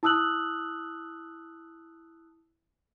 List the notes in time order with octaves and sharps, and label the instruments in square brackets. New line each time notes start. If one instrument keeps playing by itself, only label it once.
[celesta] E4 A5 D#6 E6 F#6 F#7